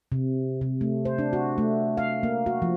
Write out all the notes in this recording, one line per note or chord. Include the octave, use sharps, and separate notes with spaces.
C3
C3
A3
C5
D4
F#4
A3
F5
A#3
F#4
F3